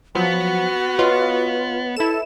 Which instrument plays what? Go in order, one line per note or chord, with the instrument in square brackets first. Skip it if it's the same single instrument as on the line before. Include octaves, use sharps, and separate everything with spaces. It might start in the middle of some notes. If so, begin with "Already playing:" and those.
[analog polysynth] F3 F#3 [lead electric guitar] B3 [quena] F#4
[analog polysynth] F4 [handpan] B4 C#5 D#5
[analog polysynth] E4 E7 [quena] A4